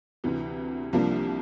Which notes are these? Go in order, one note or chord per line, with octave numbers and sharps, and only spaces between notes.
D2 C3 E3
C2 C3 F3 A#3 D4